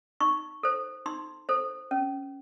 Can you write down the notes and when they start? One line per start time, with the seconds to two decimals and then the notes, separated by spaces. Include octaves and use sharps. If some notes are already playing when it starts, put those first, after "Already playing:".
0.20 D#4 C#6
0.63 A4 C5
1.06 D#4 C6
1.49 A4 C5
1.91 C#4